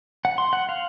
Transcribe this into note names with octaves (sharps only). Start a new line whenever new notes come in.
F#5
C6
F#5
F5